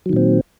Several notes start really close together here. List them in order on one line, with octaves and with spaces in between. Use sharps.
F#3 D#3 A#2 C4